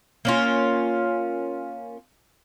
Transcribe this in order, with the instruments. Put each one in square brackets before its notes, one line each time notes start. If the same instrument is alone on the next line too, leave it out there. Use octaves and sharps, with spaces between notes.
[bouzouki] A#3 C#4 F4